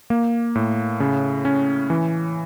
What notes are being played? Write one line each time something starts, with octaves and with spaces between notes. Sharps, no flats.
A#3
A2
C#3
C#4
E3